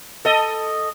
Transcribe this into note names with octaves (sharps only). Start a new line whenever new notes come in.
A4 D#5